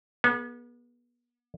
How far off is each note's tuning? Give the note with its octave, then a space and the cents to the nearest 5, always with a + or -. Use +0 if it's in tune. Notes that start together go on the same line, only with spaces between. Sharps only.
B3 -35 G#4 +25